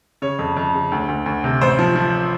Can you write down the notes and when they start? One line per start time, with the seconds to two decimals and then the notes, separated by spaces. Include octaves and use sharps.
0.22 C#3 C#5
0.39 F2
0.57 F2
0.74 C#3
0.92 D2
1.08 D2
1.26 D2
1.44 C3
1.61 A1 C5
1.79 F3
1.96 F3